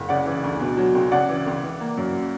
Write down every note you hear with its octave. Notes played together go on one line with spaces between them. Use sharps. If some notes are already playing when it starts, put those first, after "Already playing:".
Already playing: F#1
C#3 D5 F#5
E3
D2
B2
F#3
C#2
C#3 D5 F#5
E3
C#2
E3
A#3
F#2